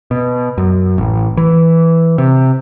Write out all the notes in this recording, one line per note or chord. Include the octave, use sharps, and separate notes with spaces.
B2
F#2
A1
E3
C3